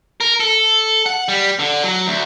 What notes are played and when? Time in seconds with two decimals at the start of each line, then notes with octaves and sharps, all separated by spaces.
0.20 A#4
0.40 A4
1.06 F#5
1.28 G3
1.59 D3
1.84 F#3
2.07 D2